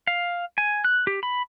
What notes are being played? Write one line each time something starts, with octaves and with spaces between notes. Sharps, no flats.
F5
G#5
F#6
G4
B5